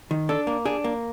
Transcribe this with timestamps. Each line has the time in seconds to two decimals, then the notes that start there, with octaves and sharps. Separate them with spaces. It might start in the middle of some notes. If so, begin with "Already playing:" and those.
0.11 D#3
0.29 D4 A4
0.47 A#3
0.65 D4 G#4
0.84 A#3